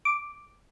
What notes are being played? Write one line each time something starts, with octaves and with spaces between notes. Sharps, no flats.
D6